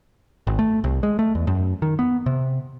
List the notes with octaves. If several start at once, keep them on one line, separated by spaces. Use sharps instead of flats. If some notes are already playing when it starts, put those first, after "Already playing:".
G#1
A3
C2
G#3
A3
E2
F#2
D#3
B3
C3